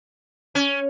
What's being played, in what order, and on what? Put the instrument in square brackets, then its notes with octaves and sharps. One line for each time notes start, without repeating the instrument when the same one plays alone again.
[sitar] C#4